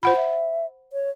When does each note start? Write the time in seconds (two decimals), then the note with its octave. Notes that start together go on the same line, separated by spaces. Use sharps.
0.03 F4 C5 F#5 B5
0.16 E5
0.93 C#5